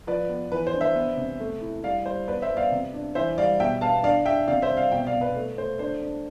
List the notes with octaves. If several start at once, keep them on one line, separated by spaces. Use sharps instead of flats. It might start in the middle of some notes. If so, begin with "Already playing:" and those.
F3 B4 D5
B3
E3 B4
C5
D4
C5 E5
B3
C3
A3
E4
G3 D5 F5
G3 C5
B3 B4 D5
C5 E5
B3
D5 F5
C3
D4
E3 C5 E5
G3 D5 F5
B2 E5 G5
B3 F5 A5
D4 D5 F5
D4 E5 G5
C3 D5 F5
C5 E5
C3
D5 F5
B2 E5 G5
D5 F5
B2
B4 D5
A3
A3 C5
D4 C5
D4